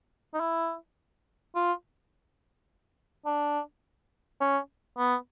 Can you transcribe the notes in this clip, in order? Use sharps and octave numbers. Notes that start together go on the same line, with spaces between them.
D#4
E4
F4
D4
C#4
B3